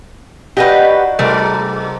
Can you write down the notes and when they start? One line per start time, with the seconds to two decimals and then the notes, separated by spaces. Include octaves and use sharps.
0.57 D4 D#4 F#4 G4 B4 D#5 F#5 F6
1.19 G#2 C3 F#3 A3 A#4